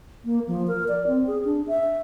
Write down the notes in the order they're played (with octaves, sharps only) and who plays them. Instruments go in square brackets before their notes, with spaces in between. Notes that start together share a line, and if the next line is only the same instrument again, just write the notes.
[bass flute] A#3
F3
A#4
D5
C4
G#4
D4
E5